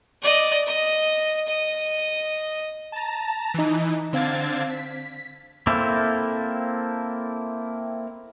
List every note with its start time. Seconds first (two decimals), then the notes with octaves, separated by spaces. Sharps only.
0.22 D5 D#5
0.67 D#5
1.48 D#5
2.92 A5 A#5
3.54 E3 D#4
4.13 D3 C4 F5 G#6 A6
4.70 B6
5.67 A#3 C4 E4 A4